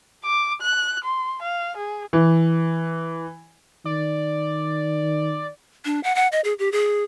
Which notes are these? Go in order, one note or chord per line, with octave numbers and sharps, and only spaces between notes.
D6
F#6
C6
F5
G#4
E3
D#3 D5
D4
F#5
F#5
D#5
G#4
G4
G#4